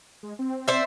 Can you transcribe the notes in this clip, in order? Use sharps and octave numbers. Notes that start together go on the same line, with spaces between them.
G#3
C4
C5 D5 E5